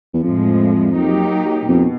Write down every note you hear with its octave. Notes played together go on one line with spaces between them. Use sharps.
E2
F2 A2 F3 G#3
F#3 A#3 D#4 G4
F2 B2